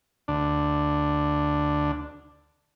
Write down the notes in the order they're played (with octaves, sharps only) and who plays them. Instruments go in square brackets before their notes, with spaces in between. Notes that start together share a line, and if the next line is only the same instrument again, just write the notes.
[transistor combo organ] D2 D4